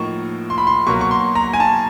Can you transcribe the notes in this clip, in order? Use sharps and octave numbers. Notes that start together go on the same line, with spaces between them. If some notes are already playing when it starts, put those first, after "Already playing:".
Already playing: A2 F3 A#3 D#4 C#6
C6
B5
C6
B2 F#3 A#3 C#6
C#6
C6
A#5
G#5
A5